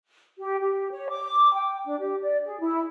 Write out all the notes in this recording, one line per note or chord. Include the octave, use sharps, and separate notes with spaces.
G4
G4
C#5
D6
G5
D4
G4
D5
G#4
E4